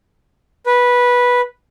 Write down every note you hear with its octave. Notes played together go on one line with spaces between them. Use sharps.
B4